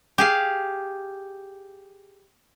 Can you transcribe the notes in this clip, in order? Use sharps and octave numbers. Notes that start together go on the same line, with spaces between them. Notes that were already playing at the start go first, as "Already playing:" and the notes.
G4 G#4 F5